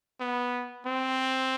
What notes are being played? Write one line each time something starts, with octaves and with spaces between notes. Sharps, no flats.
B3
C4